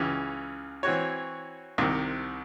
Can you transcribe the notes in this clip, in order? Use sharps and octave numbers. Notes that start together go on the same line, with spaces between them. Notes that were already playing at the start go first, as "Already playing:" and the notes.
Already playing: C#2 C#3 E3
E3 C4 F#4 C#5
C2 C3 D#3